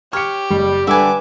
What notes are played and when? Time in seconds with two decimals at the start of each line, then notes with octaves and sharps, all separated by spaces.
0.13 G4 C#5 F6 C#7
0.50 F#1 G3
0.87 D3 G3 B4 E5 G#5 D6